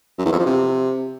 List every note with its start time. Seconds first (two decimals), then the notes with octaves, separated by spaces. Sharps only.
0.19 F#2
0.25 E2
0.32 F2
0.39 F3
0.46 C3